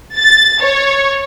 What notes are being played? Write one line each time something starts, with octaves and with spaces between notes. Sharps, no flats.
A6
C#5